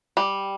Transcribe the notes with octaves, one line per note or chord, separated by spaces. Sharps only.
G3